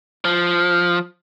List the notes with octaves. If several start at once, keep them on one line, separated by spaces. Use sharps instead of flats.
F3